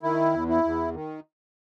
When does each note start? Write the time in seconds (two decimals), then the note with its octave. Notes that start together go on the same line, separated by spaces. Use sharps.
0.03 D#3 E4
0.33 E2
0.49 E4
0.63 E2
0.94 D#3